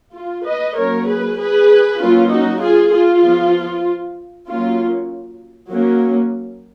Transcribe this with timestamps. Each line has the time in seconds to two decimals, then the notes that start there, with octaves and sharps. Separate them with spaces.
0.15 F4
0.46 B4 D#5
0.77 F#3 A#3 C#4 A#4 C#5
1.07 G#4 B4
1.39 G#4 B4
2.00 F#3 A#3 C#4 F4
2.31 D#4 F#4
2.61 F4 G#4
2.92 F4
3.23 F3 B3
4.46 F#3 A#3 C#4 F4
5.69 F#3 A#3 C#4